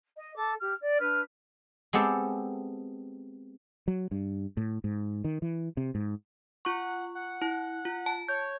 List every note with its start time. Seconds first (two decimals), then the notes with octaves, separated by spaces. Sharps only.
0.16 D#5
0.35 A4 D6
0.59 G4 F6
0.79 D5
0.99 D4 B4 F6
1.93 G#3 B3 C4 G4 A4
3.88 F#3
4.11 G2
4.57 A2
4.84 G#2
5.24 D#3
5.42 E3
5.77 C3
5.95 G#2
6.65 F4 F#5 C#6
7.15 F#5
7.42 E4
7.85 F4
8.06 A5
8.28 C#5 G6